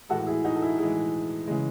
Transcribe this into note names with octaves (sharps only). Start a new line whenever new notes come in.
A2 E3 G#3 F#4 A4
E4 G#4
D#4 F#4
A4
E4 G#4
A2 E3 G#3 E4 G#4
C#3 E3 G#3